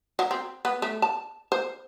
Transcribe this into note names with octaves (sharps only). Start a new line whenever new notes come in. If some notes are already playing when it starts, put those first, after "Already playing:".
F#3
C4
B3
A3
A5
C5